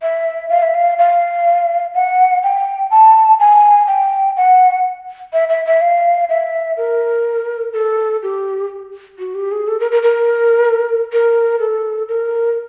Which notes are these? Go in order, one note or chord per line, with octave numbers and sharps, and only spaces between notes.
E5
F5
E5
F5
F5
F#5
G5
A5
G#5
G5
F#5
E5
E5
E5
F5
E5
A#4
A4
G4
F#4
G4
G#4
A4
A#4
A#4
A#4
A#4
A4
A#4